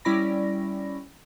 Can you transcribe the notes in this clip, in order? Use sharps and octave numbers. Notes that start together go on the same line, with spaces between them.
G3 C#4 E4 D5 B5 A#6